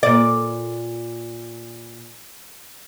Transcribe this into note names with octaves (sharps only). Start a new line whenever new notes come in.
A#2 D5